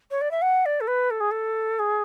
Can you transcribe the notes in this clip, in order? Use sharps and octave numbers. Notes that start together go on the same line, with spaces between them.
C#5
D5
E5
F#5
D5
A4
B4
A4
G#4
A4
G#4